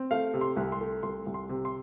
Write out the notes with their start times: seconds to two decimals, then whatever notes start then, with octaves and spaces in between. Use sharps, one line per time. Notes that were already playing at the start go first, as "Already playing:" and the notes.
Already playing: C4
0.11 A3 F5
0.34 C3
0.41 C6
0.56 C2
0.72 C6
0.81 A3
1.03 C2 C6
1.27 C2
1.34 C6
1.49 C3
1.65 C6